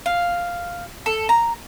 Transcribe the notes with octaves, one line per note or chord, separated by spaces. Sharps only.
F5
A4
A#5